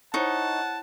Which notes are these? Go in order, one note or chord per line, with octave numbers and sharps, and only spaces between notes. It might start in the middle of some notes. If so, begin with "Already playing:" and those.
D#4 E4 C5 C#5 F#5 A5 C#6